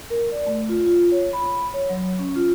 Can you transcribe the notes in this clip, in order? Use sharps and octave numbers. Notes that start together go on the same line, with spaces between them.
A#4
D5
A3
F4
F4
C#5
B5
C#5
F#3
C#4
F4